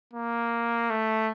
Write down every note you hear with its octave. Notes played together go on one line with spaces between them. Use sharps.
A#3
A3